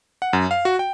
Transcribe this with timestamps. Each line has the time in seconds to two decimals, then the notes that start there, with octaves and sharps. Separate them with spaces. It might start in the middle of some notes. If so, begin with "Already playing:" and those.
0.22 F#5
0.33 F#2
0.51 F5
0.65 F#4
0.79 G5